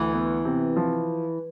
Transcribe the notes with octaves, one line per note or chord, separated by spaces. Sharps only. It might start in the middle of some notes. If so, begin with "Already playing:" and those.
Already playing: D2 E3
B3
C3
F3